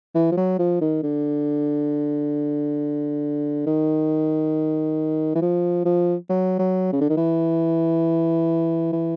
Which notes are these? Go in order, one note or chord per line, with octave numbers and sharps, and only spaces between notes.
E3
F3
F#3
F3
D#3
D3
D#3
E3
F3
F3
F#3
F#3
C#3
D3
D#3
E3
E3